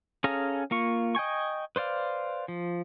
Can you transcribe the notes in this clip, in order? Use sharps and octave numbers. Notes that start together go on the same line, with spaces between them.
C#4 G#4 A4 F5 A#5
A#3 F4 C#6
D#5 G5 G#5 C#6
B4 C5 D5 F5
F3